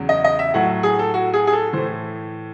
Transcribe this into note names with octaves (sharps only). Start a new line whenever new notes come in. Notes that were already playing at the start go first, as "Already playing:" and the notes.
Already playing: E2 C#3 F#3
D#5
D#5
E5
A2 F#3 F#5
G#4
A4
F#4
G#4
G#4
A4
A2 E3 C5